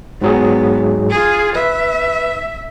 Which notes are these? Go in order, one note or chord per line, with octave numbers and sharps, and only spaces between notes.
G#2 F#3 B3 G#4
F4 G#4
B4 E5